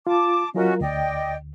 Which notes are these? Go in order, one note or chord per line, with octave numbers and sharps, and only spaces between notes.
F4 A5 D6
F#3 C#4 F4 F#4 A#4 D#5
D2 D5 D#5 G5